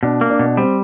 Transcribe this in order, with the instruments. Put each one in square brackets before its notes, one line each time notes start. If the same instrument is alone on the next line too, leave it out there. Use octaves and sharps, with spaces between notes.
[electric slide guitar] B2 [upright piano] D4
[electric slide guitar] A#3
[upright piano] D4
[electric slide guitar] B2
[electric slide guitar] G3 [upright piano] C4